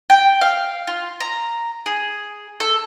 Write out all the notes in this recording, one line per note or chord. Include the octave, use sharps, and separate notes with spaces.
G5
F5
F4
A#5
G#4
A4